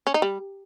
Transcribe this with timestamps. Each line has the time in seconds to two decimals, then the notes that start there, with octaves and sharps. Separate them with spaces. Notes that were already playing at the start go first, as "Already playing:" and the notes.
0.07 C#4
0.14 D#4
0.22 G3